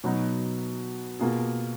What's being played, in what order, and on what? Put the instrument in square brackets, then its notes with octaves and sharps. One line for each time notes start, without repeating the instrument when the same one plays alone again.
[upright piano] B2 F#3 B3 D#4 F#4
B2 A#3 F4 G#4